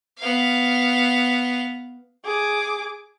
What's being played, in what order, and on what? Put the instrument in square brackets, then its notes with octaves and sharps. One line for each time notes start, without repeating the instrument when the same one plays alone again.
[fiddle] B3 F5
[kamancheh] G#4 D6